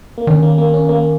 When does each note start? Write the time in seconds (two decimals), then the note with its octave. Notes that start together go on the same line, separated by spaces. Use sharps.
0.18 A#3
0.27 D#3 C#4
0.43 A#3
0.58 A#3
0.74 C#4
0.89 A#3